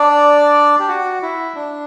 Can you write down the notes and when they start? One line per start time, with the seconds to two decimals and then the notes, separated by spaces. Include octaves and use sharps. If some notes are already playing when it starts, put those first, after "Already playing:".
Already playing: D4 D5
0.79 G4
0.89 F#4
1.23 E4
1.56 D4